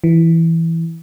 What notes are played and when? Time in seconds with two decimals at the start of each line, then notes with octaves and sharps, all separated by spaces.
0.04 E3